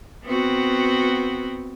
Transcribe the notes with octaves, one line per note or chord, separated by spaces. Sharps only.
B3 C4 F#4